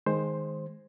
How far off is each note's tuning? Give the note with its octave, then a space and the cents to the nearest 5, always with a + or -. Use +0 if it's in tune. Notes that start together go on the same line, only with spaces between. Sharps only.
D#3 +0 G#3 +0 C5 +10